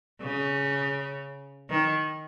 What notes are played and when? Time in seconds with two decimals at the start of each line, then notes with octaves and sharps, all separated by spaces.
0.22 C#3
1.70 D#3